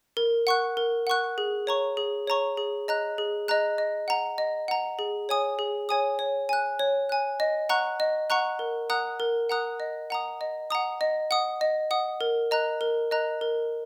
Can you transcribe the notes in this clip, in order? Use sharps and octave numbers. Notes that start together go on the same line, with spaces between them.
A#4
F#5 C#6 F#6
A#4
F#5 C#6 F#6
G#4
C#5 A#5 C#6
G#4
C#5 A#5 C#6
G#4
D#5 A#5 F#6
G#4
D#5 A#5 F#6
D#5
F#5 A#5
D#5
F#5 A#5
G#4
C#5 G#5 D#6
G#4
C#5 G#5 D#6
C#5
G#5 F#6
C#5
G#5 F#6
D#5
F#5 A#5 C#6 F#6
D#5
F#5 A#5 C#6 F#6
A#4
F#5 A#5 D#6 F#6
A#4
F#5 A#5 D#6 F#6
D#5
F#5 A#5 D#6
D#5
F#5 A#5 D#6
D#5
F#5 D#6
D#5
F#5 D#6
A#4
D#5 A#5 F#6
A#4
D#5 A#5 F#6
A#4